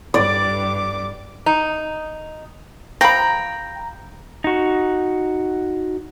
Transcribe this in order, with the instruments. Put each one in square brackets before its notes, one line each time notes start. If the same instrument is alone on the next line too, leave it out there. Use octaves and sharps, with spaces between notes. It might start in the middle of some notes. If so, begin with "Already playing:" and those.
[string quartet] G2 D6 [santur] D5
[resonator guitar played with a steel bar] D#4
[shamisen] F3 B5 [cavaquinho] G5 [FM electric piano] A#5
[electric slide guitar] D#4 F#4